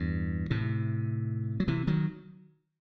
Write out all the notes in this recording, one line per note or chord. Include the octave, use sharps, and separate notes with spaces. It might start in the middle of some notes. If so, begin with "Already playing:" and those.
Already playing: E2 G2
A2 C3
F#3
C3 E3
D#3 F#3